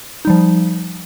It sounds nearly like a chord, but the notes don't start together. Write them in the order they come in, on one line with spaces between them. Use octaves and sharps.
D#4 G3 F3